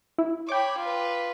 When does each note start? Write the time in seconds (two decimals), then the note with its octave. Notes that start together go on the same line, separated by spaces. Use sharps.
0.18 E4
0.49 C#5 G5 B5 D6
0.79 F4 B4